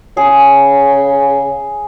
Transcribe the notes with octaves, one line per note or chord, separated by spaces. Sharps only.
C#3 G#4